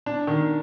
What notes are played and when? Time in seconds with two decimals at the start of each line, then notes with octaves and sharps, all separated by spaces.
0.06 D4
0.27 D#3